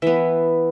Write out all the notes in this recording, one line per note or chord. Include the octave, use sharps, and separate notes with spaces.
E3 B3 E5